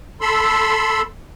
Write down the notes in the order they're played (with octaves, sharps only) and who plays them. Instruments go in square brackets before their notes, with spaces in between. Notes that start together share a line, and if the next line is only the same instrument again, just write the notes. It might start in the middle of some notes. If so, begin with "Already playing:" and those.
[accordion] A4 B5 C6 E6